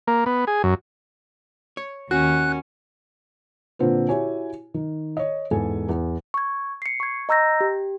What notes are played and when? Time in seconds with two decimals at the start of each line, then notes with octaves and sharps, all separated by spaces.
0.08 A#3
0.26 B3
0.47 G#4
0.64 F#2
1.77 C#5
2.11 D#2 C#4 F#4 F#6
3.79 A#2 D3 C4 F4 B4
4.09 E4 F#4 G4 C#5 G#5
4.74 D#3
5.17 C#5 D#5
5.51 E2 G#2 A4 G#5
5.89 E2
6.34 C#6 G#6
6.82 C7 C#7
7.00 C#6 G#6
7.29 D#5 A#5 E6 G6 A#6
7.61 G4